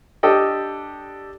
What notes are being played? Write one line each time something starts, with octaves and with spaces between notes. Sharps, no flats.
D4 G4 A4 D#5 G5